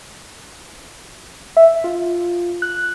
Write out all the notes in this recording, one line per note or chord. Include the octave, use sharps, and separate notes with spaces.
E5
F4
F#6